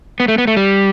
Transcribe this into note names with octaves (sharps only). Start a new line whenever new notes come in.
B3
A3
B3
A3
G3